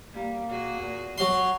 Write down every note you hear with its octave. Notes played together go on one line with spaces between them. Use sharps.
G3 A#3
A#2 F#4 G#4
E2
F#3 C6